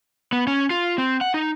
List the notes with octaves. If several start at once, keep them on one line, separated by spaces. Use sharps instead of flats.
B3
C#4
F4
C4
F#5
D#4